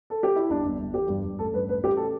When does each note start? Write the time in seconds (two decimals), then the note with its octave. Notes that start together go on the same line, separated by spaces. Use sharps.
0.10 A4
0.23 G4
0.36 E4
0.50 G1 D4
0.65 G1
0.79 G1
0.94 E3 G4
1.09 G2
1.24 G2
1.39 A1 A4
1.53 G2 B4
1.69 A1 B4
1.83 A1 G4
1.97 A4